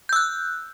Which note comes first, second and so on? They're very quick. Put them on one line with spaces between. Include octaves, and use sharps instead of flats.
G6 E6 F#6